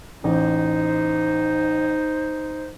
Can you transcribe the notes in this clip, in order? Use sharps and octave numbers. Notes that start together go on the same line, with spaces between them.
A1 D#4 C5